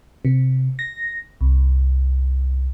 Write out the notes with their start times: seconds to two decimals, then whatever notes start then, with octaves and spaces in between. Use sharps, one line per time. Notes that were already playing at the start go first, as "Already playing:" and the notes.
0.25 C3
0.79 A#6
1.41 C2